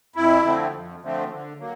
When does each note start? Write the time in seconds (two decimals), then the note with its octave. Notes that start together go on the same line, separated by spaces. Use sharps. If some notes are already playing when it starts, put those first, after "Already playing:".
0.16 F2 E4
0.44 D3 F3 A3 C4
0.73 F2
1.02 D3 F3 A3 C4
1.31 D3
1.59 F#3 A#3